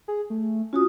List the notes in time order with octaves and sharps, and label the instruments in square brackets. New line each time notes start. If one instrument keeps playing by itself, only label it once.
[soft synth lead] G#4
A3
[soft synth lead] C#4 [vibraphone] F4 F#4 D#6